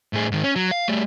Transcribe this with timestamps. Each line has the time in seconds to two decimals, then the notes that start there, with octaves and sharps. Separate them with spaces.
0.13 A2 G#4
0.31 G#2 D#3
0.44 C#4
0.56 F#3
0.71 F5
0.88 G3 A3